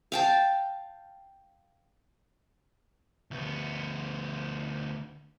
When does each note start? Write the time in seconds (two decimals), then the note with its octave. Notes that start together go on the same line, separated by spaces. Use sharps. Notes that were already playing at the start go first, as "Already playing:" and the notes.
0.12 F5 G5 A5
3.31 D2 B3